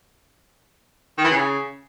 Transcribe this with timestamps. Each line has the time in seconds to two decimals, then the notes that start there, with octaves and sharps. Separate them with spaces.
1.18 D#3
1.25 E3
1.31 C#3